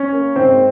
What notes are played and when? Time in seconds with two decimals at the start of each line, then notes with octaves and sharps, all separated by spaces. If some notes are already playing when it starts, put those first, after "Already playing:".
Already playing: C#4 C#5
0.12 A#3
0.36 G#2 C4 C5